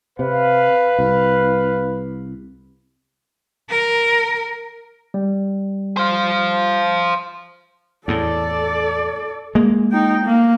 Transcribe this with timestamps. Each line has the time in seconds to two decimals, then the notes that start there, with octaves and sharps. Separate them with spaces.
0.19 C3 B4 F5
0.99 C2
3.70 A#4
5.14 G3
5.97 C5 F5
8.08 E2 A2 A4 D5
9.55 G#3 A#3
9.92 D#4 G5
10.26 A#3